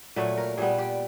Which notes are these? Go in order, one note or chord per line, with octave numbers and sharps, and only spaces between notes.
A#2 F#3 A3 B4
A#4
A#2 G3 B3 G#4
G4